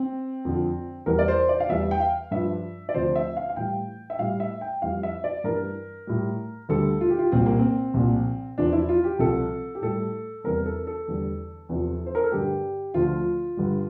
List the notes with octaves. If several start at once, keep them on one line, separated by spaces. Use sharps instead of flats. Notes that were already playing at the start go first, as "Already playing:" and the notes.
Already playing: C4
F2 D3 F3
E2 E3 G3 A#4
D5
C5
D5
F5
E2 E3 G3 E5
G5
F5
G2 F3 E5
D5
D2 C3 F3 C5
E5
F5
F5
A2 E3 G3 G5
E5
A2 G3 F5
E5
G5
F2 E3 G3 F5
E5
D5
G2 E3 G3 A#4
A2 G3
D2 D3 G3 A4
F4
G4
F4
C2 A#2 G3 C4
A#3
C4
C2 A#2 F3
E2 C3 F3 D4
E4
F4
G4
C2 C3 F3 A4
G4
A2 G3 A4
E2 C3 G3 A#4
A4
A4
E2 D3 G3
E2 C3 F3
C5
A#4
A4
G2 D3 G3 G4
D2 D3 F3 F4
G2 D3 G3